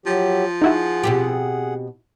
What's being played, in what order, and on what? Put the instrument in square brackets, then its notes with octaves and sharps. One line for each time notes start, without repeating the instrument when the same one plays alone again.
[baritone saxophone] F3 [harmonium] F#3 G4
[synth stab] D#4 E4 F#4 [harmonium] G#4 F#5
[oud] B2 C4 G4